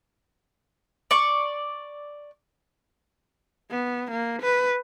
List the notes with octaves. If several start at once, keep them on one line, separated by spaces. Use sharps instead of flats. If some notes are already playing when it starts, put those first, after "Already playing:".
D5 C#6
B3
A#3
B4